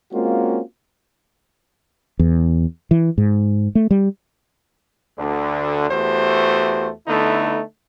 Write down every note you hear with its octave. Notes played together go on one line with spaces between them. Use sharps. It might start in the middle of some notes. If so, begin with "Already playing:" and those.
G#3 A#3 C4 C#4 F4 F#4
E2
E3
G#2
A3
G3
D2 D3
E2 A3 F#4 G4 C5
D3 A3 B3 D#4 E4